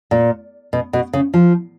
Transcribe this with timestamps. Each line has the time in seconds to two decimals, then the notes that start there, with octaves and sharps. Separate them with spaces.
0.11 A#2
0.73 B2
0.93 B2
1.13 C#3
1.34 F3